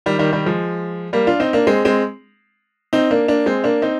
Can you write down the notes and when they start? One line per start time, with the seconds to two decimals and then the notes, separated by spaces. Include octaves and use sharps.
0.06 D#3 G3
0.19 D#3 G3
0.33 D#3 G3
0.46 F3 G#3
1.13 G3 A#3
1.27 D4 F4
1.40 C4 D#4
1.53 A#3 D4
1.67 G#3 C4
1.85 G#3 C4
2.93 C4 D#4
3.11 A#3 D4
3.28 A#3 D4
3.46 G#3 C4
3.64 A#3 D4
3.82 C4 D#4